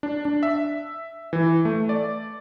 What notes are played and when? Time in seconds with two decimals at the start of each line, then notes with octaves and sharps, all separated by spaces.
0.03 D4
0.25 D4
0.43 E5
1.33 E3
1.65 A3
1.89 D5